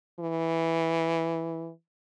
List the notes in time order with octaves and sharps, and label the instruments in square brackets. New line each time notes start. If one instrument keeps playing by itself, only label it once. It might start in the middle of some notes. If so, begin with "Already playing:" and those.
[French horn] E3